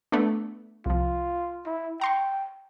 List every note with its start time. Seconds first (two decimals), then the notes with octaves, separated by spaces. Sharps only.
0.12 A3 B3 D4
0.86 C2 F3 F4
1.66 E4
2.01 G5 A#5 C6 C#6